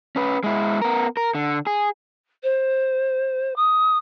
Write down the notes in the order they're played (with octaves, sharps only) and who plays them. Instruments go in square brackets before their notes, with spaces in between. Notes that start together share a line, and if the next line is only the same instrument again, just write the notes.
[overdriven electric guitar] C#4 B4
G#3 E4
B3 A#4
A#4
D3
G#4
[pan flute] C5
D#6